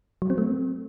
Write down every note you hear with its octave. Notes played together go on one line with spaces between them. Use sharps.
F#3
C4
A3